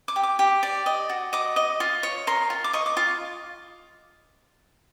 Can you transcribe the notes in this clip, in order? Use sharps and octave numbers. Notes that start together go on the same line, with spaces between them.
D6
G4
D6
G4
D5
D#5
F#4
D#5 D6
D#5
F4
C#5
A#4 C6
F4
D6
D#5 C#6
D6
F4 D6